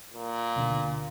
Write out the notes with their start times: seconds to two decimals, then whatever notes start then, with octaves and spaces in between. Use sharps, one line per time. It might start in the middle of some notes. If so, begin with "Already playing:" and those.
0.13 A#2
0.56 D2 B2 D3